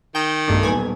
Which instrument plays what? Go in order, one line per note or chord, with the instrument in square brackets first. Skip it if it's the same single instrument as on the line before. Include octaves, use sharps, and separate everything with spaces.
[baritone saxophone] D#3 [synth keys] G5
[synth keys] B1 G2 D4 [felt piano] A3
[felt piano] D#1 B1 B3 [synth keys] G#5